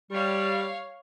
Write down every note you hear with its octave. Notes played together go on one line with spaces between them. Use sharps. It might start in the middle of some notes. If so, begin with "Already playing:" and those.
G3 G4 C#5 F5